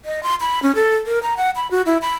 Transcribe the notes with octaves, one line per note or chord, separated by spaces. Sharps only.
D#5
C6
B5
C#4
A4
A#4
A#5
F#5
B5
F#4
E4
B5